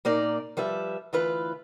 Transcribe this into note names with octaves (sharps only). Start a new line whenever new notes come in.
A#2 A#3 D#4 D5
F3 G3 B4 E5
D2 E3 F4 B4